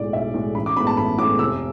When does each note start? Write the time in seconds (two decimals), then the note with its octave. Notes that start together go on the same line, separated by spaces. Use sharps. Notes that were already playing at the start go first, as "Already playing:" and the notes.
Already playing: B1 A2 G#3 D5
0.13 B1 E5
0.34 A2 G#3
0.55 A1 B5
0.66 D6
0.76 A2 G#3 B3 B5
0.87 A5
0.97 A1 B5
1.18 A2 G#3 B3 D6
1.39 F1 E6